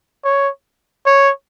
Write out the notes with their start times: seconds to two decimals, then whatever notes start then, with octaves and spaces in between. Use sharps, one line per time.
0.25 C#5
1.06 C#5